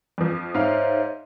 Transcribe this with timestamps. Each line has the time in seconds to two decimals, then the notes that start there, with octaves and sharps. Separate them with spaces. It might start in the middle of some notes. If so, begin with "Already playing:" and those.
0.18 F2 F3
0.54 G#2 C5 C#5 E5 F5